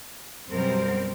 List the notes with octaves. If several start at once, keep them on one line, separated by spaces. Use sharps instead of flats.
F#2 B2 G3 C4 A#4 C5